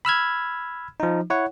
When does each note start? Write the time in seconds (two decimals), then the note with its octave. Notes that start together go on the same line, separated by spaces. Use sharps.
0.05 B5 E6 F6 G#6
1.00 F3 D#4
1.30 E4 C#5 F#5